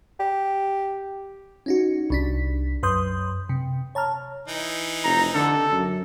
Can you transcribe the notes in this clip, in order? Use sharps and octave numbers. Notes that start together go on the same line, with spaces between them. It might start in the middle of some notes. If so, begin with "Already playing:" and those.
G4
C#4 D#4 F#4
C2 D4 B6
F#2 B4 C6 D#6 G6
C3
C#5 A5 A#5 F6
E3 D#4
F1 A#5
D3 A4
F#2